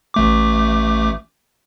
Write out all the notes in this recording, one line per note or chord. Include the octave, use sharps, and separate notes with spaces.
A1 A3 D6